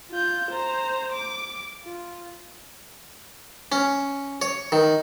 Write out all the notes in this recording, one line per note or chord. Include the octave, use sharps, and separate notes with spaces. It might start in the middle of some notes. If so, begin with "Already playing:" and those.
F4 G6
C5 A#5
D6
F4
C#4
C#5
D#3